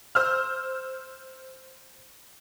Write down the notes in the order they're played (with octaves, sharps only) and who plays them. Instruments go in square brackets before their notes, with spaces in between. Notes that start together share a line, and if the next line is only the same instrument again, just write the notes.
[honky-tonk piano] C5 E6 F6